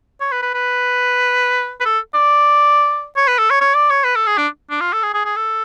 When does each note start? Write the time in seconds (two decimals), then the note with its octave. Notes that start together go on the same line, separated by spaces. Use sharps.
0.21 C#5
0.32 B4
0.43 B4
0.54 B4
1.80 B4
1.86 A4
2.14 D5
3.17 C#5
3.28 B4
3.38 A4
3.50 C#5
3.61 C#5
3.75 D5
3.90 C#5
4.04 B4
4.16 A4
4.27 G#4
4.38 D4
4.70 D4
4.81 F4
4.93 A4
5.03 G#4
5.14 G#4
5.25 G#4
5.36 A4